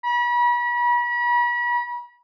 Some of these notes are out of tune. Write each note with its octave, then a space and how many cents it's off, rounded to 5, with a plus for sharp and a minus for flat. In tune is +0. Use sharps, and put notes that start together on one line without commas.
B5 -40